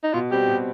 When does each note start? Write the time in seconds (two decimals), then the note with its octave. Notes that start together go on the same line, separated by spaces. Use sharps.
0.04 D#4
0.14 B2 F4
0.31 G3 C4 G4
0.48 B2